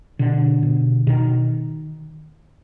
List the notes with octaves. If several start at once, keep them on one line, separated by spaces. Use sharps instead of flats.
B2 D3
B2
B2 D#3